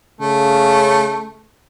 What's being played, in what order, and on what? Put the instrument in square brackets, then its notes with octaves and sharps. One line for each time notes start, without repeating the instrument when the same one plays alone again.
[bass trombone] C#3 [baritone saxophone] A3